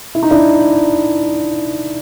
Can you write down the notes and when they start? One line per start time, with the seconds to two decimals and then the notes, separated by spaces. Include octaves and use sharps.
0.15 E4
0.23 D#4
0.31 D4 E4